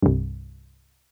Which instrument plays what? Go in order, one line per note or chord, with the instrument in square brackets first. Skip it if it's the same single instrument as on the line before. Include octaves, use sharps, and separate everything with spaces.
[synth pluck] C2 G2